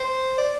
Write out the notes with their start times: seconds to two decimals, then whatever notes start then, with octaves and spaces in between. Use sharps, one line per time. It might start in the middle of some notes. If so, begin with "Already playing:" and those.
Already playing: C5
0.38 D5